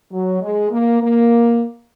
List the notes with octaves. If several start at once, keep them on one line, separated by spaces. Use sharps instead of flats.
F#3
G#3
A#3
A#3